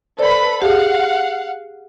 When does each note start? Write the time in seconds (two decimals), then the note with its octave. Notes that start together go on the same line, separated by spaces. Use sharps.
0.19 A4 B4 C5 D5 B5
0.62 G4 G#4 F5 F#5